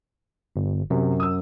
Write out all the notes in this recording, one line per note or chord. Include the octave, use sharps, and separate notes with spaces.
G1
F#2 C3
D#6 E6